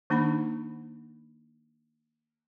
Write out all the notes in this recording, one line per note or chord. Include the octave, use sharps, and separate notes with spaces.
D#3 A#3 D4 D#4 F#5 B5